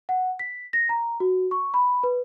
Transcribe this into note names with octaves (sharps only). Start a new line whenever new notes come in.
F#5
B6
A#6
A#5
F#4
C#6
B5
B4